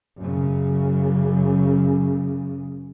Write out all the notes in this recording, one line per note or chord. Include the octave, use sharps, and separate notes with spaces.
F#2 C#3